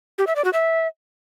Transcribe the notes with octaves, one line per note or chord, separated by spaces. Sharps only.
G4
E5
D5
F#4
E5